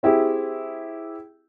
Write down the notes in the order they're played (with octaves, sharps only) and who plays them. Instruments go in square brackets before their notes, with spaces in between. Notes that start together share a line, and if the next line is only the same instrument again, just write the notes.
[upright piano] C4 E4 G4 G#4